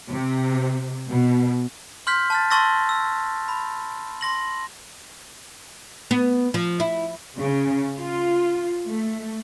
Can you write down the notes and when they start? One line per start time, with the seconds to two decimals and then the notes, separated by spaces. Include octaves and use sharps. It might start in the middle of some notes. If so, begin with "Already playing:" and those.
0.10 C3
1.09 B2
2.07 C6 F6 G6 B6
2.30 A5 F6 A6
2.51 A5 C6 C#6 E6 A6 A#6
2.89 E6
3.48 B5
4.21 C6 A#6 F#7
6.11 B3
6.54 F3
6.80 E4
7.39 C#3
7.98 F4
8.88 A3